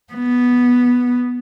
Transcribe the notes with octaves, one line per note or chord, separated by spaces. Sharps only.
B3